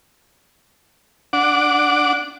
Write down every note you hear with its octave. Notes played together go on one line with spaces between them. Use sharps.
D4 F#5 D6